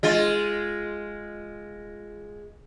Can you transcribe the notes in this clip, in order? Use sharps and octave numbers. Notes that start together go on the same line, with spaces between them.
G#3 F4